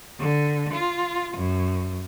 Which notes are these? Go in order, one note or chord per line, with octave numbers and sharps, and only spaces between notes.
D3
F4
F#2